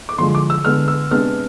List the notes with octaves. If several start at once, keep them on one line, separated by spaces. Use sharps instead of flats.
D6
D3 F3 G#3 C6
D6
E6
D3 G#3 B3 D4 F6
E6
C3 G#3 B3 D4 F6